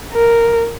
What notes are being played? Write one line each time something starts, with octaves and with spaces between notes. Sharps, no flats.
A#4